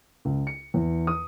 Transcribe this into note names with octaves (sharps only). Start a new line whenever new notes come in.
C#2
C#7
E2
D#6